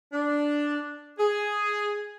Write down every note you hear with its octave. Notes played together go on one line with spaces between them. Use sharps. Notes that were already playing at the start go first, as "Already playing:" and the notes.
D4
G#4